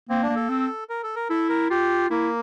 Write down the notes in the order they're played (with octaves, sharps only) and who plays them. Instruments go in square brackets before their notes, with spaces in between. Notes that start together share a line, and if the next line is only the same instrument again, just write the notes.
[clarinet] A#3 [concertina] C4
[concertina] D4
[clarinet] A#3
[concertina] A4
[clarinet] C4
[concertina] A#4
A4
A#4
[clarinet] E4 [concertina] A4
[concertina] A#4
[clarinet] F4 [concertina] G4
[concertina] A#3 [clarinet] E4